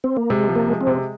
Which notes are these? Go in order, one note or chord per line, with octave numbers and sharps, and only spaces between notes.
C4
A#3
C3 G#3
F3
A#3
G#3
C4
C3